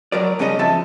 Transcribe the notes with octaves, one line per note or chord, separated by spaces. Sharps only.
F#3 A#4 D5
G2 C#3 C#4 G4 D#5
F2 F3 E5 A5